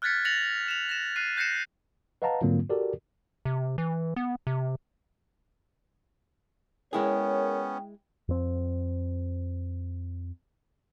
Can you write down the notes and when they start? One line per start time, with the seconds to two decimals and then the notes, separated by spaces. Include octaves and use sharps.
0.02 F6 F#6 G#6 A6 B6 C#7
0.25 A6 A#6 C#7 F7 F#7
0.68 E7 F7
0.89 A#6 E7
1.16 F#6 C7 D#7
1.37 F#6 G6 A#6 C7 C#7 E7
2.22 B4 D#5 F5 F#5 A5 A#5
2.41 G#2 D3 F#3 A#3 C4 F4
2.70 F#4 G4 A4 A#4 D5
3.45 C3
3.78 E3
4.16 B3
4.47 C3
6.93 G#3 B3 C#4 E4 G#4 A#4 C#5 G5
8.28 F2 C4